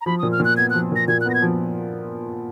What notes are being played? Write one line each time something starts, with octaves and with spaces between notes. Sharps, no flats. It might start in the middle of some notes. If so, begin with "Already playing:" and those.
A#5
F3 B5
D#6
A#2
F6
A#2
F#6
B3 G#6
F#6
F3
A#2 A#6
A#2 G#6
F#6
B3 A#6
G#6
F3